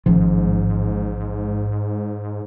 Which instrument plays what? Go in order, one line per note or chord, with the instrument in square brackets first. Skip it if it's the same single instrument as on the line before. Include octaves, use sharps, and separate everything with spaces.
[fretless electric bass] A1 D#3 F3 [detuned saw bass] G#2